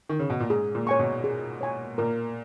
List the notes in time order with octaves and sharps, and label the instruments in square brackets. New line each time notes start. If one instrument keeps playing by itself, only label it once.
[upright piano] D#3
C#3
B2
A#2
[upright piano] G#2 [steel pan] G#4
[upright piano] A#2
[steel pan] C#5 G#5 C#6
[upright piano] B2
[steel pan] G#4
C#5 G#5 C#6
[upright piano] A#2 [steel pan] A#4